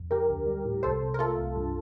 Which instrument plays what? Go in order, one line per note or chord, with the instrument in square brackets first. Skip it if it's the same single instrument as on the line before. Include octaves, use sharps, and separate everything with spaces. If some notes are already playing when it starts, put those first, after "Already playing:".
Already playing: [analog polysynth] F2
D3 G4 A#4
D2
G3
A2
C2 A4 C5
C2
A#4
A3 F4 A4
C2
G2